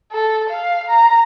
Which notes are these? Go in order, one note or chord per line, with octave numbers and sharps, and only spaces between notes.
A4
F5
A#5